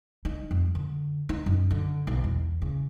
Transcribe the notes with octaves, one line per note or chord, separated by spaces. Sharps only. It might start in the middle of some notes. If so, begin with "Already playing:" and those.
D#4
F2
D3
D#4
F#2
D3
B1
E2
C#3